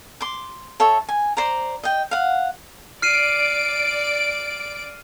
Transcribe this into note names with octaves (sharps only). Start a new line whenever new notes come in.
C6 D6
A4 C#5 E5
G#5
C5 D5 A#5
D#5 G5
F5 F#5
D5 F6 C7 D7 D#7